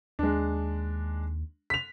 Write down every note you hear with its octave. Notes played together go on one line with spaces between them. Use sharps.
D#2 G#3 D4
B6 F7